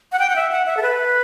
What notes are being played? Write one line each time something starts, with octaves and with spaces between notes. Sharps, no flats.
F#5
G5
F#5
E5
F#5
E5
A4
B4